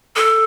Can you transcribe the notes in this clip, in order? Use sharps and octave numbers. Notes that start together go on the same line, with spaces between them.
A4